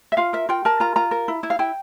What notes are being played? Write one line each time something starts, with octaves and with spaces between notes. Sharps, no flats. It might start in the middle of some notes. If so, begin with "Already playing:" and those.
E5
F4 F5
A#4 E5
F4 G5
A#4 A5
F4 A#5
F4 A#5
A#4
E4
E4
F5
E4 G5